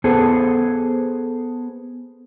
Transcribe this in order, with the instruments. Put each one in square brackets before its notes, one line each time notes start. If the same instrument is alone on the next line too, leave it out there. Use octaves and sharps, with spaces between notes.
[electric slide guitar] B3 G#4 A4 C5